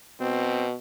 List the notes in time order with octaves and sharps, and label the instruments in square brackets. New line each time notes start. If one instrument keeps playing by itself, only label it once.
[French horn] B2 [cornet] C4